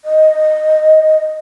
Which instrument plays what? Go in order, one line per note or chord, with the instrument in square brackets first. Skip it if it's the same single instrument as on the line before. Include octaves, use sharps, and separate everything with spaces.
[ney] D#5